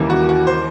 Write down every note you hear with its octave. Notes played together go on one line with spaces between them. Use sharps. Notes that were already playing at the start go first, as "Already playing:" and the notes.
Already playing: D#2 C#3 E3 G3 A#3
F#4
F#4
C5